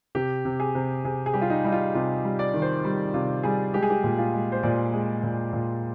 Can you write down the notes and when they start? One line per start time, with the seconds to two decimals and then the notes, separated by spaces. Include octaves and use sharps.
0.15 C3 G4
0.45 C3
0.60 G#4
0.75 C3
1.05 C3 G#4
1.26 G#4
1.33 G3 G4
1.42 F4
1.50 D#4
1.64 G3 D#4
1.72 F4
1.95 C3 F4
2.24 G3
2.39 D5
2.54 D#3
2.62 C5
2.84 G3
3.14 C3 F4
3.43 G3 G#4
3.74 G#3 G4
3.82 G#4
3.90 G4
4.04 A#2
4.18 F4
4.34 G#3
4.52 C5
4.63 A#2 D5
4.93 G#3
5.23 A#2
5.53 A#2